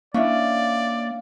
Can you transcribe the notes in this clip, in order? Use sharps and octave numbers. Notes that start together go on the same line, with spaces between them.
A#3 C#4 D4 E4 D5 F5